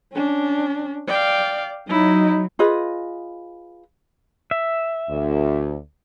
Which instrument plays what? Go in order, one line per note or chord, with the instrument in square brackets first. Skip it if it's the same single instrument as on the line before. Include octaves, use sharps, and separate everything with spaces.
[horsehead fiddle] C#4 D4
[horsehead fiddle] D5 [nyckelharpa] F5 G5
[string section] F#3 [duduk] D#4 [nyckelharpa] E4 [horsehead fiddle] D#5
[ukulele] F4 G#4 B4 D#5
[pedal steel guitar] E5
[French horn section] D2